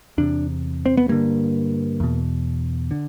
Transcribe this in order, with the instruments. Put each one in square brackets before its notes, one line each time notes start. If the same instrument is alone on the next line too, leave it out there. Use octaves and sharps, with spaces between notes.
[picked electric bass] E2 C3 D4
C4
B3
G2 D3 A#3
E2 B2
D3